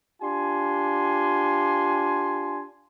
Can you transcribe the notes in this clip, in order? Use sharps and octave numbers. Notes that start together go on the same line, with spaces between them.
D4 F4 G4 G#5 C6